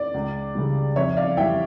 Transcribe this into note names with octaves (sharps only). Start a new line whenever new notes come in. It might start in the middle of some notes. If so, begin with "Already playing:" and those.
Already playing: D5
C#2
C#3 G3
F2 C#5 E5
D5 F5
E3 G3 E5 G5